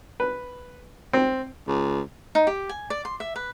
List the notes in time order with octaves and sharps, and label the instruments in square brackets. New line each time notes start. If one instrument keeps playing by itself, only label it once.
[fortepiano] B4
C4
[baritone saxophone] C#2
[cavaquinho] D#4
G4
G#5
D5
C6
E5
B4